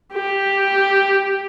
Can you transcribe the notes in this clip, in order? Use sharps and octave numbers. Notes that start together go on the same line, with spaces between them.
G4